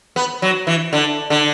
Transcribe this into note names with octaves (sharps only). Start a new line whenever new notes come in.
B3
F#3
E3
D3
D3